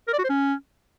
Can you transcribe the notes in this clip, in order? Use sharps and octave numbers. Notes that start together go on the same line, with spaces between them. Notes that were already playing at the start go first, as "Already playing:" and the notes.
A#4
D5
F#4
C5
C#4